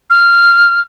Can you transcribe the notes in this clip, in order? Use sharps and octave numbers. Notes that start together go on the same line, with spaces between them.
F6